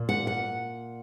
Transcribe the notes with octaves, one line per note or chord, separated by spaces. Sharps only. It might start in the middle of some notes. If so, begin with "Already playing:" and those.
Already playing: A#2 A#3
F#5
F#5